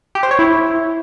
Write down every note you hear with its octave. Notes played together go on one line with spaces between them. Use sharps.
G4
C5
C#5
E4